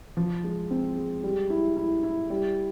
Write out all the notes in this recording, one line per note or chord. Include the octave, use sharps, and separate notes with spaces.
F3
G#3
C4
G#3
G3
E4
E4
E4
G3